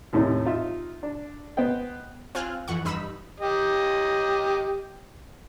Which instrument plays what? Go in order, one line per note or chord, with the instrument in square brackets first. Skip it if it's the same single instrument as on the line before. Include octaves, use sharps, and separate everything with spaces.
[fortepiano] D#2 A2 C3 C#4 D#4
D#4 F4 E5
D4
B3 C5 D#5 G5
[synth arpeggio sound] C4 F4 G#5 F6 F#6
F2 E3 F#5 C#6
G2 D#4 B5 E6
[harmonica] G4 D#5